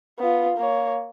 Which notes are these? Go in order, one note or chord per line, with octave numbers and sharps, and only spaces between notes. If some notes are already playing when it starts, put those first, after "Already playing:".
B3 F4
A#3 C#5